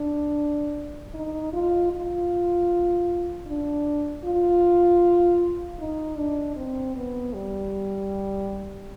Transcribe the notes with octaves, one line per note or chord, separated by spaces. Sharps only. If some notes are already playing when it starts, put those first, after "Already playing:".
Already playing: D4
D#4
F4
F4
D4
F4
D#4
D4
C4
B3
G3